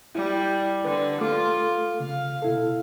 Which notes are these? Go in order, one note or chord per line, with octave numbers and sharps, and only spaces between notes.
G3 E4
D3 B4
A3 F4 A4 D6
C#3 F5
B2 E4 A4